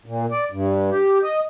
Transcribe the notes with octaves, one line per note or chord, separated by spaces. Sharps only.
A#2
D5
G2
G4
D#5